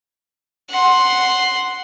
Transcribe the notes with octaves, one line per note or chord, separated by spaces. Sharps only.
F#5 C6